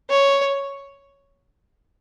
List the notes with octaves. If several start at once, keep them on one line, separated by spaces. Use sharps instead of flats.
C#5